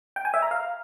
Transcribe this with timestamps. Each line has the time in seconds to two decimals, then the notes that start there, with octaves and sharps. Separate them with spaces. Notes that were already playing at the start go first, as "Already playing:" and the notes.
0.16 G5
0.25 G#5
0.34 E5
0.42 A#5
0.51 F5